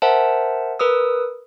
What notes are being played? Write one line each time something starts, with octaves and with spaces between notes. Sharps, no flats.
A#4 C5 E5 F#5 A5
A#4 B4 D#6 E6